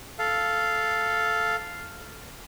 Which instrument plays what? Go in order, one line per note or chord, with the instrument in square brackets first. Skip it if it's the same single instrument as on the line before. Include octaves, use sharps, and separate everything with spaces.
[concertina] A4 F5